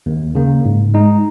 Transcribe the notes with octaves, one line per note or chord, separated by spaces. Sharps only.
D#2
C#3 A#3
G#2
G#3 D#4